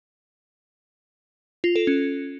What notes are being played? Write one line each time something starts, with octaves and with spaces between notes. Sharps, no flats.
F4
A4
C#4